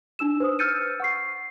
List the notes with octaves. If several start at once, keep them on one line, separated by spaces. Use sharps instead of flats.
D4 D#4 E6 E7
B4 C5 D#6
E6 F6 G6 A6 C#7 D#7
F#5 C#6 C7